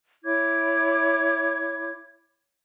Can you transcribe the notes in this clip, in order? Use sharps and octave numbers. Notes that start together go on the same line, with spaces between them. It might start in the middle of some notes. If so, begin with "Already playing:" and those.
E4 C#5 D6 G#6